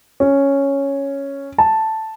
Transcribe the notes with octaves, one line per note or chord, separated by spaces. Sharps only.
C#4
A5